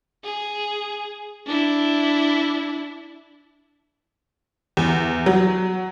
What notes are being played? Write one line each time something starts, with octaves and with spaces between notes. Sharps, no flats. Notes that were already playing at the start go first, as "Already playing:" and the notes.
G#4
D4 E4
E2
F#3